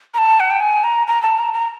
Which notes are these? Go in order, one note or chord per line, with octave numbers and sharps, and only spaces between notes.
A#5
A5
F#5
G5
G#5
A#5
A#5
A5
A#5
A#5